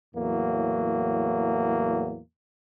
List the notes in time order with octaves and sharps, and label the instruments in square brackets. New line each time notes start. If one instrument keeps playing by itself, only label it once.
[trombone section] E2 A2 F#3 A#3